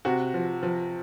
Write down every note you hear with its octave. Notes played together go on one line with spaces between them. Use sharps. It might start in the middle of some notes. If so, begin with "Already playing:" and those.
C3 F#4
F3
F3